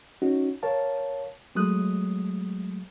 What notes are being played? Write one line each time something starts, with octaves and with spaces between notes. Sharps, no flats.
C#4 D#4 F#4
A#4 C#5 F5 A5
F#3 G#3 A3 D#6 F#6